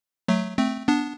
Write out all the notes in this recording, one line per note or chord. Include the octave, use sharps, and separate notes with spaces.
F#3 A3
A3 C4
B3 D4